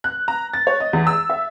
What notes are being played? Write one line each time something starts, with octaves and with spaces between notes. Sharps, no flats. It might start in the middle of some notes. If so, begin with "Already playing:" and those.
F#6
A#5
A6
C#5
D#5
E2
E6
E5